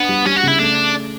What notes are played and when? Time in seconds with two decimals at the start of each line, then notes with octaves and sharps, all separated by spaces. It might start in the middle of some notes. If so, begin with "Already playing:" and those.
Already playing: B3 D4
0.09 G3
0.25 G3 C#4
0.36 F#4
0.43 C#3 E4
0.59 A3 D4